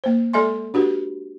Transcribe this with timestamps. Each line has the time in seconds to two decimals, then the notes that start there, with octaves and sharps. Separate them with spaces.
0.04 A#3 C5
0.33 G#3 A4 D5 E5 G#5 C6
0.74 D4 F#4 G4 B4